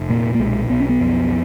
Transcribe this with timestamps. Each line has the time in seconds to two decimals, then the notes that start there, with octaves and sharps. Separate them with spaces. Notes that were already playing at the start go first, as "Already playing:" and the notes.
Already playing: F1
0.09 A#2 A#3
0.35 A#3
0.39 B1 G#3
0.70 B1 B3
0.80 C#4
0.89 B3
1.00 F2